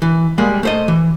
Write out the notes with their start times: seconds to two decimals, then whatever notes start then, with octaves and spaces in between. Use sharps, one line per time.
0.02 E3
0.38 G3 G#3 A#3
0.63 A3 C5 D#5
0.88 E3